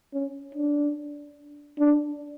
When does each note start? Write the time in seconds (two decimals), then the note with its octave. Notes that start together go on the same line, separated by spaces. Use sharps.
0.13 C#4
0.55 D4
1.79 D4